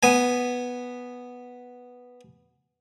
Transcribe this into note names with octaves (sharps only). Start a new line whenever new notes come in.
B3 G#5